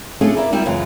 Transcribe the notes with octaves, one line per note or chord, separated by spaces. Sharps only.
A3 C#4 D4 F4 G#4 A4
A#3 E4 D5 E5
G3 A#3 E4 F4 G4
F#2 C#3 E3 G#3 C#4 F4